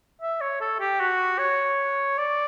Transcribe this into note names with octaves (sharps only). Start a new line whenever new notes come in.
E5
C#5
A4
G4
F#4
C#5
D5